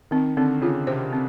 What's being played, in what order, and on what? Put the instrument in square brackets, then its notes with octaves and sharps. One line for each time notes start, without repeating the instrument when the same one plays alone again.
[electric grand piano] D#3 [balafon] C4
[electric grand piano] D3 [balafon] C4
[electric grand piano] C#3 [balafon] F4
[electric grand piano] C3 [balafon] C5
[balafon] C4